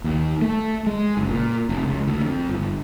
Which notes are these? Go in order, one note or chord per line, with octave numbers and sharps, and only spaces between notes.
D#2
A3
G#3
F#1
A#2
F1
C#2
D2
F2
G1